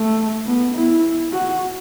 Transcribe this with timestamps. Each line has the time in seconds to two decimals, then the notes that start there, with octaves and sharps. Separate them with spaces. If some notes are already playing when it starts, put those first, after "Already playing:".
Already playing: A3
0.46 B3
0.74 E4
1.32 F#4